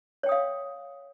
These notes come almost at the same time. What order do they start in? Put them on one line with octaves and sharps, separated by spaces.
C#5 G5 D#6 F5